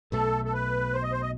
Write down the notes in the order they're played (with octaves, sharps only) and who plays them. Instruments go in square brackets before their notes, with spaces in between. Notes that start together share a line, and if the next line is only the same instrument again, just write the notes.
[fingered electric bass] B1 B2 A3 [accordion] A4
[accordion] A4
B4
C5
D#5
C5
D#5